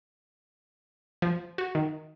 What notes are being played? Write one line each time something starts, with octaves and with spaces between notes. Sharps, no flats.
F3
F#4
D#3